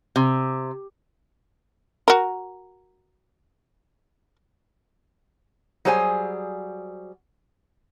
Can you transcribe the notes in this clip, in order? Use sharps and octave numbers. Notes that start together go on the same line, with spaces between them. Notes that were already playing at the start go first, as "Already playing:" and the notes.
C3
F#4 A#4
F#3 G3 G#4 C5 C#5 G#5